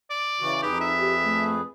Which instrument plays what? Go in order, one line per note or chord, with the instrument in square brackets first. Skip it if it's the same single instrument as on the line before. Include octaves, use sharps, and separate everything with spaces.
[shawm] D5
[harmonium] C#3 E3 F#4
[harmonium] F2 G#4 B4 [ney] D#4 [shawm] G4
[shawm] E5
[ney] G4
A3